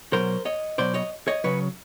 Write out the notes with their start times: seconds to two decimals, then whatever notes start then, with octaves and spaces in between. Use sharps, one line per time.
0.13 B2 F#3 A#4 C5
0.45 C#5 D#5
0.78 B2 F#3 C5 D5
0.94 C#5 D#5
1.28 C#5 D#5
1.44 C#3 F#3 B4 C#5